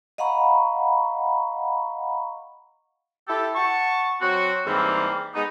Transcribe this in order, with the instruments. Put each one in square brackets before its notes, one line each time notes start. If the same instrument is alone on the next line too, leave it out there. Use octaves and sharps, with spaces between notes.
[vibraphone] D#5 F5 F#5 A#5 B5 C#6
[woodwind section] E4 G4 A4
F#5 A5 C#6
F#3 C4 F#4
G#2 E3 G3 A#3 C4
G#3 B3 D#4